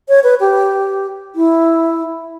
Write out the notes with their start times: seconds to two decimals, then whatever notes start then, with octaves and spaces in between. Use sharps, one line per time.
0.09 C#5
0.23 B4
0.40 G4
1.35 E4